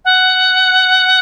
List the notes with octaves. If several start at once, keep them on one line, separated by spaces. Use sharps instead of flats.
F#5